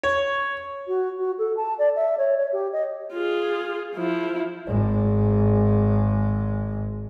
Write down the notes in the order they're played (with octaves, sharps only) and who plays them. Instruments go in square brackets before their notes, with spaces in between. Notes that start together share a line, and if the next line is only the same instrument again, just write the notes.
[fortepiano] C#5
[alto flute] F#4
F#4
A4
A5
D5
E5
C#5
C#5
G4
D#5
[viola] F4 G#4
F3 E4
[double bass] G#1 G#3